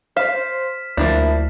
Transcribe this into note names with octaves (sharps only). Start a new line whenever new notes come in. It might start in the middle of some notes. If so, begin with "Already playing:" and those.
C5 F5 F6 B6 E7
D2 F3 A#3 D4 E4